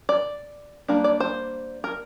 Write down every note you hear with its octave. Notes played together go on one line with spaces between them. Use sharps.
D5
G3 A#3 D4
D5
C5
A#4